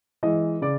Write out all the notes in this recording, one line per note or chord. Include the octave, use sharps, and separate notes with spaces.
E3 G#3 D#5
C#3 D5